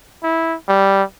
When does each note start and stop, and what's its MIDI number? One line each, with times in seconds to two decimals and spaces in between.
0.24 0.56 64
0.68 1.03 55